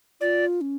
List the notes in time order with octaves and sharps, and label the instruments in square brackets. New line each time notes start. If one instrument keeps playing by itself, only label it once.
[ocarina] F4 [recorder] D5
[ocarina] C#4